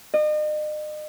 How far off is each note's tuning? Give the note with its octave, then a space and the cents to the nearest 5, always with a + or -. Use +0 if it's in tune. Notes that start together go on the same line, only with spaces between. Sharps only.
D#5 -40